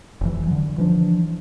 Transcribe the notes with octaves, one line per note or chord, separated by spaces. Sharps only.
F1 E3
D3 F#3
E3 F3 D4